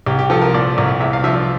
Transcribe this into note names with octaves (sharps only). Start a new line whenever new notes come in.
C2 G4
G4
F3 A4
A#4
A#2 D5
C2
E2 E5
F5
F3 E5
D5